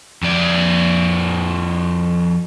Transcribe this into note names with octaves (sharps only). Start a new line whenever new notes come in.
F2 D5